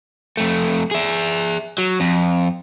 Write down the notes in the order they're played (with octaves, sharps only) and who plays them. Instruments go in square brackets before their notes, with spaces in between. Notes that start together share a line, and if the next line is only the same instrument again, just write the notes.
[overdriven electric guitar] F2 A3
G#4 E5
F#3
F2